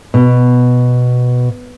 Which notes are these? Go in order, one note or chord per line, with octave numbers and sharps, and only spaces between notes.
B2